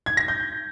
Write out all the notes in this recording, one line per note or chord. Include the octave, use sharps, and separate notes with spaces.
G#6
A#6
G6